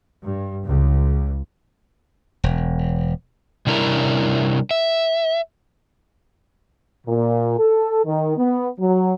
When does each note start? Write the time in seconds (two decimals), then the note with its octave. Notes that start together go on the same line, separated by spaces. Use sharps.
0.24 G2
0.67 C#2
2.44 E1
3.67 C3 G3 C#4 D4 E4 A#4
4.71 E5
7.07 A#2
7.58 A4
8.05 D#3
8.37 B3
8.79 F#3